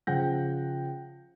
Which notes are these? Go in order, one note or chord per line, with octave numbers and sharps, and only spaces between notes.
C#3 F3 F#5 G5 G6 A#6